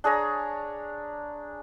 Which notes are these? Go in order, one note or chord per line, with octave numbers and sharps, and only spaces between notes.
D4 G#4 C#5 A#5